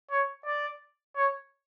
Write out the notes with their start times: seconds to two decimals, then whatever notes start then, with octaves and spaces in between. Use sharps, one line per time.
0.11 C#5
0.46 D5
1.16 C#5